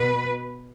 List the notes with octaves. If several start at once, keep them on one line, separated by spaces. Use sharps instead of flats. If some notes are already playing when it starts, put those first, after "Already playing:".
Already playing: B2 B4